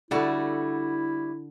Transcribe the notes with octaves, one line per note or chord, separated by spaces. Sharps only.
D3 G3 A3 E4 F#4 A4